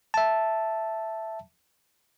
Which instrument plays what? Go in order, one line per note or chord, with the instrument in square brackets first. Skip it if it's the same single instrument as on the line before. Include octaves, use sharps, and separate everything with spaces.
[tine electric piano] E5 A5